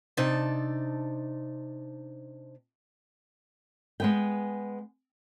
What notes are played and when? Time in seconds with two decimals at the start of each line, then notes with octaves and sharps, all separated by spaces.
0.17 C3 D4 D#4 A5
4.00 G#3 B3 G5